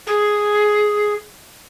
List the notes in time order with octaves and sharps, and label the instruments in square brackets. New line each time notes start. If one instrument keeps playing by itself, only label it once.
[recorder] G#4